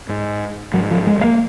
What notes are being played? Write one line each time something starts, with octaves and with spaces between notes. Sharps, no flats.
G#2
G#2 F#3
F3
G#3
G#3
A#3